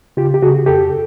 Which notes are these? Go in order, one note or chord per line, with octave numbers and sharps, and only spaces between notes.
C#3 F4 G4
G4
C#3 F#4 G#4
F2 G4 A4